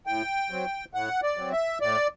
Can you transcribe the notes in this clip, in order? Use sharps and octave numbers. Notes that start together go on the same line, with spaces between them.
A2 G5
F#3 C4
A2 F#5
D5
F#3 C4
E5
A2 D5